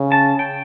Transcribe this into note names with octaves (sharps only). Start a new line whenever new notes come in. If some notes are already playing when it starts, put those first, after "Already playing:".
Already playing: C#3
A5
G5